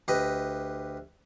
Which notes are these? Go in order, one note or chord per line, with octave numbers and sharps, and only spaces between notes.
D2 G4 B4 D#5 B5